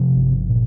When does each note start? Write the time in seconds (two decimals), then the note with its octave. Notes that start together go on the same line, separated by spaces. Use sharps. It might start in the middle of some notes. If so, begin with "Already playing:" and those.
Already playing: C3 F3
0.15 G1
0.49 A#2